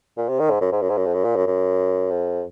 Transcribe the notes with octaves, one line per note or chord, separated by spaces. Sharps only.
A#2
C3
D#3
G#2
F#2
G#2
F#2
G#2
F#2
F2
F#2
A#2
F#2
F#2
F2